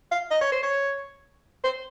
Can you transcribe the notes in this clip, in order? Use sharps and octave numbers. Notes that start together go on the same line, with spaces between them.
F5
D#5
C#5
C5
C#5
C5